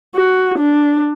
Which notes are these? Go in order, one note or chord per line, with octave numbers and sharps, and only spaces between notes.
F#4
D4